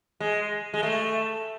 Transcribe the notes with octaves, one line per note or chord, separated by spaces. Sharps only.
G#3
G#3
A3